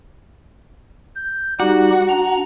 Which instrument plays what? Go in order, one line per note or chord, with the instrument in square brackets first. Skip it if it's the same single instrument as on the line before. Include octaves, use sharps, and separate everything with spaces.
[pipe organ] G6
[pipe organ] G3 D#4 G4 [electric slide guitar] F#4
[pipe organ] D4 A#5